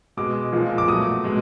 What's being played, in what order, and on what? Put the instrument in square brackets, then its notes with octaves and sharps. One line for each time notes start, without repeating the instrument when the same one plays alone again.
[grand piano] B2 G#3 D6
A#2 F3 G#3
D6
B2 F#3 A3 D#6
B2 G#3